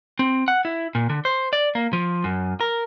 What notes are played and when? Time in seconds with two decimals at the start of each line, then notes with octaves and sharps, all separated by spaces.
0.19 C4
0.48 F#5
0.65 E4
0.95 A#2
1.10 D3
1.25 C5
1.53 D5
1.75 A#3
1.93 F3
2.24 F#2
2.61 A#4